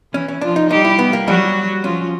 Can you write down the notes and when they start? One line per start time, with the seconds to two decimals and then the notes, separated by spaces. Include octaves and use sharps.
0.13 E3 C#4 E4
0.28 C#4
0.41 F3 D4 F4
0.56 D#4
0.70 G3 D#4 G4
0.85 E4
0.99 B3
1.13 A#3
1.27 F#3 G3 F#4
1.84 F3 C#4 F4